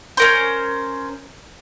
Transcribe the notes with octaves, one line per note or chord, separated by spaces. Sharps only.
C#4 A#4 C5